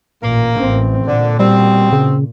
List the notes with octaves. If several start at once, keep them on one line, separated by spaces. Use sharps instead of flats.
A1 A#2 A#3
A1 C4
A#2 D3
B2 G3 C4
C#3